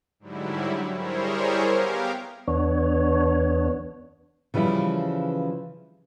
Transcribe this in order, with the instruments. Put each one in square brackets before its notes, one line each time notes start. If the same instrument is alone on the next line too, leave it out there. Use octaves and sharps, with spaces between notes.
[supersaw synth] G#2 D3 F#3 G3 E4
G3 E4 G#4 A#4 C5 C#5
B3 G4 A#4 F5
[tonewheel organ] E2 B3 D4 C#5
[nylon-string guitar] C#3 E3 F3 G3 E4